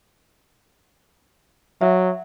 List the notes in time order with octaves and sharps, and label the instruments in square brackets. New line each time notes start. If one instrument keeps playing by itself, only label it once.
[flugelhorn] F#3 [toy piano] E5